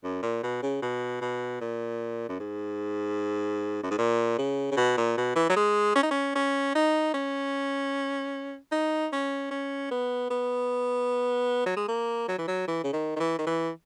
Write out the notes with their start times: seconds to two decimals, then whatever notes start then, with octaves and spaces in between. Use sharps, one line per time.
0.04 F#2
0.22 A#2
0.43 B2
0.63 C#3
0.82 B2
1.21 B2
1.61 A#2
2.29 F#2
2.40 G#2
3.83 F#2
3.91 G#2
3.98 A#2
4.38 C#3
4.72 C#3
4.77 B2
4.98 A#2
5.17 B2
5.36 E3
5.50 F#3
5.57 G#3
5.96 C#4
6.03 D#4
6.11 C#4
6.36 C#4
6.75 D#4
7.14 C#4
8.72 D#4
9.12 C#4
9.51 C#4
9.91 B3
10.31 B3
11.66 F#3
11.77 G#3
11.88 A#3
12.28 F#3
12.38 E3
12.48 F#3
12.68 E3
12.84 C#3
12.93 D#3
13.16 D#3
13.20 E3
13.39 D#3
13.47 E3